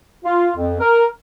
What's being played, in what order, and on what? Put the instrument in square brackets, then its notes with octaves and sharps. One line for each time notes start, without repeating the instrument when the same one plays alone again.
[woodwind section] F4
F2
A#4